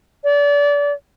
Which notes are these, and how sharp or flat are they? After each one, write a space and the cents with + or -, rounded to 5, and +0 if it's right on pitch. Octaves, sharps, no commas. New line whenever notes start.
D5 -30